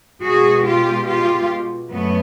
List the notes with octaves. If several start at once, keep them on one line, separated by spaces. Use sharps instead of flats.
B2 G#3 F#4 G#4
F4 G4
F4 G4
F#2 A3 B3